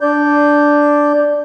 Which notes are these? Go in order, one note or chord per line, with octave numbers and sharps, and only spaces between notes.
D4 D5 G6